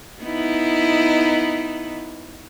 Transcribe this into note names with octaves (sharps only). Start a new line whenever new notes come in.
B3 D#4 E4